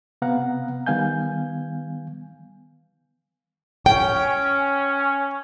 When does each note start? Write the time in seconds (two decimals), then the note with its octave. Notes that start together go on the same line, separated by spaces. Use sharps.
0.22 C3 B3 F5 F#5 A#5
0.87 D#3 G3 B3 F5 G#5 G6
3.86 C#4 G5